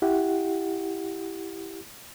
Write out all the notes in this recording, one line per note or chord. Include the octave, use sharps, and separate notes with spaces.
E4 G4 F#5